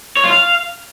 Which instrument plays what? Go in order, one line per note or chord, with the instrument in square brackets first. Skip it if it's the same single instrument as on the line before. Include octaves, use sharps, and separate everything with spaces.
[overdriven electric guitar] C#5
F4
F5